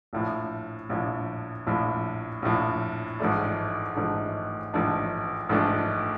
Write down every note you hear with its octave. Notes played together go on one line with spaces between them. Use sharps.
A#1 A2 F3
A#1 A2 F3
A#1 A2 F3
A#1 A2 F3
A1 G#2 F3 A3 D4
A1 G#2 F3 A3 D4
A1 G#2 F3 A3 D4
A1 G#2 F3 A3 D4